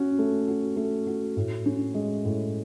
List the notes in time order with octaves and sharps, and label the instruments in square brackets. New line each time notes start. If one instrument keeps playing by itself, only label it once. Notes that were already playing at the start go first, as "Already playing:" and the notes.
Already playing: [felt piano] C#4 F#4
A3
F#4
A3
F#4
A2
C#4
G#3
A2